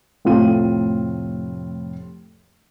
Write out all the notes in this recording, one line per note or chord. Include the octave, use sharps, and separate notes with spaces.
F1 A2 A3 C4 F4 D#7